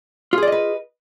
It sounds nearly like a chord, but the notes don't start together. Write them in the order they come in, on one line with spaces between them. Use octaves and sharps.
F4 G#4 D5 D#5 B4